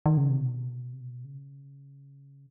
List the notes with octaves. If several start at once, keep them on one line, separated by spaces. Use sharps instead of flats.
D#3
C#3
C3
B2
C3
B2
C#3